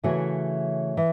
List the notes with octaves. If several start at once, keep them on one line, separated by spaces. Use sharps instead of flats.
C#3 E3 A3 F#4 C#5
E3